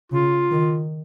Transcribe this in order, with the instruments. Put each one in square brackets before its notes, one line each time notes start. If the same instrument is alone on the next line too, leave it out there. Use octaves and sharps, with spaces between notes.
[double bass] C#3 [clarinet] F4
[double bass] D#3